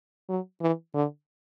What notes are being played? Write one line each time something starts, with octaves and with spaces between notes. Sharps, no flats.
F#3
E3
D3